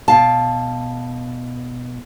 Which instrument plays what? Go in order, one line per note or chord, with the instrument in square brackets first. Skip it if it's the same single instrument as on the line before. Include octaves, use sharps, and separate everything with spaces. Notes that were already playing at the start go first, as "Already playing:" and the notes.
[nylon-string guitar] B2 F5 A5